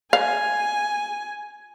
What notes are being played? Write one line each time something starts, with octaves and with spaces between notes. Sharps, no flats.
F5 G#5